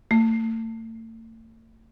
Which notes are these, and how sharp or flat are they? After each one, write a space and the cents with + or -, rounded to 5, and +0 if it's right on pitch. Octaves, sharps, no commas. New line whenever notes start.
A3 +40